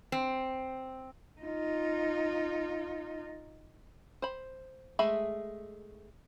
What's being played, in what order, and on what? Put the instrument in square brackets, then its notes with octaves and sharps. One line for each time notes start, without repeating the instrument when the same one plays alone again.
[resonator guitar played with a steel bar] C4
[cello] D#4 F4
[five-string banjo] C5 B5
G#3 A3 G#4 E5 B5